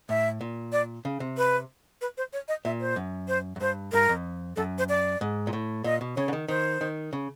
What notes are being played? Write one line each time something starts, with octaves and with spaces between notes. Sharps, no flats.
A2 E5
A#2
D5
C#3
C3
B4
B4
C5
C#5
D#5
A#2 E5
C5
F#2
C5
F#2
G2 C5
G2 A#4
F2
F#2 A4
C5
D5
G#2
A#2
A2
A#2 D#5
B2
C#3 C#5
D3
D#3
D#3 C5
D#3
C#3